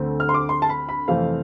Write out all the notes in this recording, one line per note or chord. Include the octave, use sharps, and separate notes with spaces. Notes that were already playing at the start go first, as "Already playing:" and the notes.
Already playing: D2 D3 A3 C4
F6
C6
D6
C6
A5
B5
B5
F2 C3 E3 A3 C4 F5